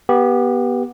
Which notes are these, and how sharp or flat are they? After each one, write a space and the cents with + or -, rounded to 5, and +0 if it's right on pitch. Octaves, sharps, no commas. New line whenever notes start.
B3 -20 G4 +0